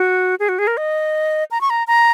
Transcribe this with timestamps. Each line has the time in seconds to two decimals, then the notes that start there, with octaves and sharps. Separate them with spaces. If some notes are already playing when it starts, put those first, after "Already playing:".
Already playing: F#4
0.40 G#4
0.49 F#4
0.59 G#4
0.67 A#4
0.77 D#5
1.51 A#5
1.61 C#6
1.70 A#5
1.87 A#5